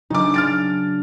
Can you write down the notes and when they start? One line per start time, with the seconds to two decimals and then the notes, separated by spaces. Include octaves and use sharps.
0.10 C#3 F#3 D4 D#4 D6
0.34 F6 A6 D7